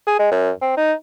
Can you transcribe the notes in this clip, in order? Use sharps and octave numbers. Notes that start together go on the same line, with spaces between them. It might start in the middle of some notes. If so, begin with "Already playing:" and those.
G#4
G#3
F#2
C4
D#4